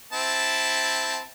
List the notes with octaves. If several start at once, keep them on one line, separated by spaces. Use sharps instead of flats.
C4 E4 A5